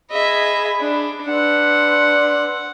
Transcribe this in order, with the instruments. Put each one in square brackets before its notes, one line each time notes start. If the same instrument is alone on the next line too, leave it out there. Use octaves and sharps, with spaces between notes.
[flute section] G#4 B5 [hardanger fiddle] D#5 E5
[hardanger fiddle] D4
[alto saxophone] D4 [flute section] B4 C6 E6 [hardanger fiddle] F#5